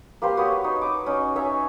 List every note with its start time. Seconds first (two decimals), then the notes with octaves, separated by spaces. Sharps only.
0.22 A#3 G4 B4 C5
0.37 F#4 B4 C#5 D#6
0.64 D#4
0.81 D6 D#6
1.06 C#4 D#4
1.36 D#4 C#5 E5 G#5